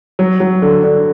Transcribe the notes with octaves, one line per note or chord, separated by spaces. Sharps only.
F#3
F#3
D3
D3